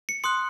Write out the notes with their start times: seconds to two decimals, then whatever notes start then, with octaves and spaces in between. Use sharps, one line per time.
0.09 C#7
0.24 C6 D#6 F#6 C#7